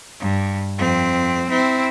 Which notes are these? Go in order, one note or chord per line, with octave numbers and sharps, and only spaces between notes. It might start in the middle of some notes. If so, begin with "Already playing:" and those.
G2
F2 C4
C4 E4